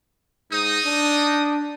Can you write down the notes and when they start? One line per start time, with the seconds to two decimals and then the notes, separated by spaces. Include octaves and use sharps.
0.51 G#2 D#4 D#6
0.86 D4